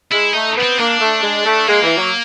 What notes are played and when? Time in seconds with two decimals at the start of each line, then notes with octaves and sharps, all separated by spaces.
0.11 G#3 E4
0.34 A3 D#4
0.56 B3
0.63 C4
0.78 A#3 D4
1.00 A3
1.23 G#3
1.45 A3
1.68 G#3 A#3
1.83 E3
1.97 F#3